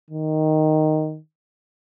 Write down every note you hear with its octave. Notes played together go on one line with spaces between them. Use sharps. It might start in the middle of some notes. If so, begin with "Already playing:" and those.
D#3